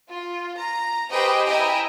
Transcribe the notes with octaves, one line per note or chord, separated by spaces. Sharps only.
F4
A#5
G4 G#4 B4 C5 D#5 G5
E4 D#5 G5 G#5 A#5